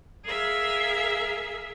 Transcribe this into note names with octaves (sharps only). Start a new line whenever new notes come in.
G#4 A#4 E5 F5